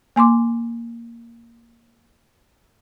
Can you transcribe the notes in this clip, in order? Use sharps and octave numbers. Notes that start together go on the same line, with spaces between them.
A#3 G#5 C6 D6